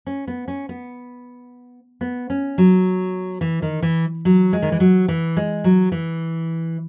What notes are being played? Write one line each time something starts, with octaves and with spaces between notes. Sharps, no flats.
C#4
B3
C#4
B3
B3
C#4
F#3
E3
D#3
E3
F#3
G#3
D#3
E3
F#3
E3
G#3
F#3
E3